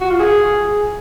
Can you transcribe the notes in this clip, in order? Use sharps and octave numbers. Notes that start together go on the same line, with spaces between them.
F#4
F4
G#4